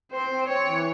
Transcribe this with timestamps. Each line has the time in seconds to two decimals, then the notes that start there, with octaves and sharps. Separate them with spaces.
0.12 C4 C5
0.29 C4
0.48 C4 C#5
0.66 E3